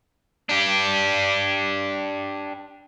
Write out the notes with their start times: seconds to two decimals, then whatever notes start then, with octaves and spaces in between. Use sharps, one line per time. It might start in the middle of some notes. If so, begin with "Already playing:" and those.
0.49 D4 G4